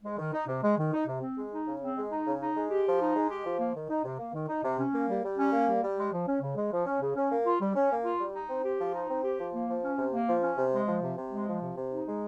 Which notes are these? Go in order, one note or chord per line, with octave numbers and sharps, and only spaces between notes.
G#3
D#3
D#4
C3
G#3
D#3
D#4
C3
C4
G#3
D#4
C#3
C4
G#3
D#4
C#3
D#4
G#3
G4
F3
D#4
G#3
G4
F3
A#3
D#3
D#4
C3
A#3
D#3
D#4
C3
C#4
A#3
G3
G3
C#4
A#3
G3
G3
G#3
F3
C#4
C#3
G#3
F3
C#4
C#3
C#4
A#3
F4
G3
C#4
A#3
F4
G3
D#4
C4
G4
F3
D#4
C4
G4
F3
A#3
F3
C#4
C3
A#3
F3
C#4
C3
G#3
F3
C3
C3
G#3
F3
C3
C3
D#4
G#3